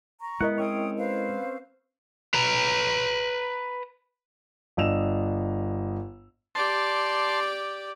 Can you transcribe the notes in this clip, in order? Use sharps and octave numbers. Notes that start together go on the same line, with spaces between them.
A#5 C#6
G#3 B3 E4 A#4 D#5 F#5
C4 C#4 C#5 G5 D#6
B4 C5 F5
B4 A#5
G1 D4 D#5 E6 E7 F7
G4 D5 A5 C6